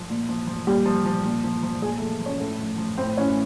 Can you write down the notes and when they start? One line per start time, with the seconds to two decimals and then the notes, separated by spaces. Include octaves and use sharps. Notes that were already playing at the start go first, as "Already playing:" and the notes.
Already playing: F3
0.10 A#2
0.29 F3
0.47 F3
0.67 A#2 G3 G4
0.86 F3
1.06 F3
1.24 A#2
1.44 F3
1.63 F3
1.82 A#2 G#3 G#4
1.97 A3 A4
2.01 F3
2.20 F3
2.25 C#4 C#5
2.40 A2 A3 A4
2.59 F3
2.78 F3
2.98 A2 C4 C5
3.17 E3 C#4 C#5